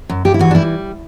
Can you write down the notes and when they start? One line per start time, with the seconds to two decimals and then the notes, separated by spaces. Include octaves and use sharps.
0.09 F#2
0.25 G2 G4
0.34 E4
0.39 E3 F#4
0.51 D4
0.55 G3 E4